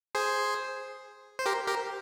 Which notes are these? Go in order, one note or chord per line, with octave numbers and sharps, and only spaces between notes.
G#4 C5
C5
G4 A#4
G4 A#4